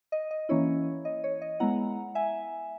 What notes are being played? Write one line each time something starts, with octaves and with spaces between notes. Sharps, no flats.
D#5
D#5
E3 A#3 C#4 E4 C#5
D#5
C#5
D#5
G#3 B3 E4 F#5 A#5
E5 G#5